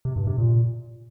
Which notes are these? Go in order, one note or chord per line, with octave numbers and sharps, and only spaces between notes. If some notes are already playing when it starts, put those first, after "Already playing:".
C3
G2
C3
A#2